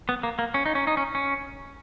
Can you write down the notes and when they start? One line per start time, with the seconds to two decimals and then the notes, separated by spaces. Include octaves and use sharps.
0.09 B3
0.23 A#3
0.39 A#3
0.54 C#4
0.66 D#4
0.75 C#4
0.87 D#4
0.97 C#4
1.15 C#4